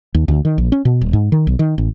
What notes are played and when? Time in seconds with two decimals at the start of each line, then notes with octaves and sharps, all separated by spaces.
0.14 D#2
0.28 D2
0.45 D#3
0.58 A#1
0.72 C#4
0.85 B2
1.01 D#1
1.13 G#2
1.32 D#3
1.47 B1
1.59 D#3
1.78 A1